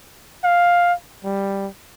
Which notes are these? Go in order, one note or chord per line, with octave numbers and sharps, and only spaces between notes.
F5
G3